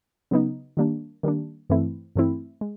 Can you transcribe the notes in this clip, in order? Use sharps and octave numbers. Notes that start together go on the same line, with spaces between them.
C#3 F#3 B3 D#4
D#3 G3 A#3 D4
D#3 G3 A#3 D4
G2 E3 A3 C4 E4
G2 E3 A3 C4 E4
G#3